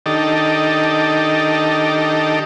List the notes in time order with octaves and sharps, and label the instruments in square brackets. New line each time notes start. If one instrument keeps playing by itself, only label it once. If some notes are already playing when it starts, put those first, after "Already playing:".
[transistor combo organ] D#3 D4 D#4 G4 A4